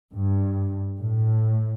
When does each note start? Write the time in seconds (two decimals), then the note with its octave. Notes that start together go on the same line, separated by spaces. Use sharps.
0.13 G2
0.99 A2